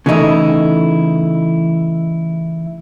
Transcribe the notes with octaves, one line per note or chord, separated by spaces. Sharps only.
C#3 E3 A3 D#4 E4